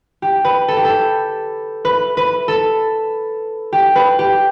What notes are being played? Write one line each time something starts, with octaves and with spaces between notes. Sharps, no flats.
G4
B4
A4
G4
A4
B4
B4
A4
G4
B4
G4